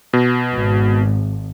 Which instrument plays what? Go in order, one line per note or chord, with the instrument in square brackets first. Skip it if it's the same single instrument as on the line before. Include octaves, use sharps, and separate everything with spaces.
[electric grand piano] B2
[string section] G#1